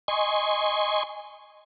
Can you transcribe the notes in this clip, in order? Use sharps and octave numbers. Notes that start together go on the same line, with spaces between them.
D#5 G#5 C6 C#6